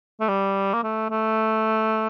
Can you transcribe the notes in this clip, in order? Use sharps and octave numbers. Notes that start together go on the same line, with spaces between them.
A3
G3
A#3
A3
A3